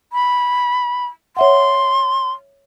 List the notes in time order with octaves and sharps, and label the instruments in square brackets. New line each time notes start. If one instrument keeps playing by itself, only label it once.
[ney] B5
[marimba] C#5 E5 F#5 [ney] C6